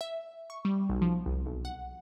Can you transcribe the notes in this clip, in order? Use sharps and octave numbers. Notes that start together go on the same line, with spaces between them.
E5
C#6
G3
B1
F3
C2
B1
F#5